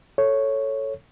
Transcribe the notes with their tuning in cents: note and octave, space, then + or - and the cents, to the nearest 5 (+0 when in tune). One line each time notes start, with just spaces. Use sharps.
A4 +0 C#5 +0